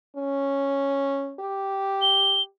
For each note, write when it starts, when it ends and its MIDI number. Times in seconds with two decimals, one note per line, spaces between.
0.16 1.34 61
1.40 2.46 67
2.02 2.42 103